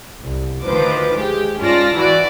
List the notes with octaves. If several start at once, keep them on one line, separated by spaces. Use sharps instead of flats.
C2
D2 D#3 F3 B4 C5 D6
G#3 G4
G#2 C#4 F4 D5 A5 A#6
E3 E4 F#4 D5